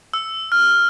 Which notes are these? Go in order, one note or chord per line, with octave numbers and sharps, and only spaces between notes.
E6
F6